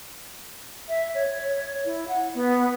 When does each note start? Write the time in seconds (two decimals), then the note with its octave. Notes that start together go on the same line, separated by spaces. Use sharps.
0.89 E5
1.15 C#5
1.38 C#5
1.85 E4
2.08 F#5
2.34 B3